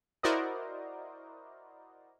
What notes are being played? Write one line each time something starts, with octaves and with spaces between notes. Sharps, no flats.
E4 F#4 A#4 C5 D5 D#5